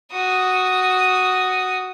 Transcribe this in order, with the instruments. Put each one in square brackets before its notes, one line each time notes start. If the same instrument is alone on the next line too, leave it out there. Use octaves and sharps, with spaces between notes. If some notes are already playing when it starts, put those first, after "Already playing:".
[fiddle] F#4 D#6